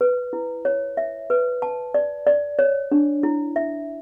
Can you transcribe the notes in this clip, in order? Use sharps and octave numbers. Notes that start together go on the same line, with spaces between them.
B4
E4
C#5
E5
B4
A5
D5
D5
C#5
D4
E4
E5